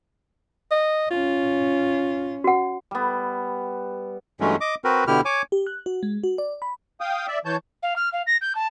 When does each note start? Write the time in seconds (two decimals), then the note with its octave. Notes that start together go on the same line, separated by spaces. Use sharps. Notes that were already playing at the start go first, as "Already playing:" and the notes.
0.71 D#5
1.11 C#4 F4
2.44 F#4 F#5
2.91 G3 B3
4.40 G2 E3 F#3 G#3 A3 C#4
4.61 D#5 D6
4.84 C4 F#4 A#4 B4
5.07 B2 D3 E4 G4 F6
5.25 C#5 G#5 D6
5.52 G4
5.67 F#6
5.86 F#4
6.03 G#3
6.23 F#4
6.38 D5
6.62 B5
7.01 F5 G5 D#6
7.27 D5 E5
7.45 E3 C#5 A5 G6
7.83 F5
7.96 F6
8.13 F5
8.27 A#6
8.41 G6
8.55 A5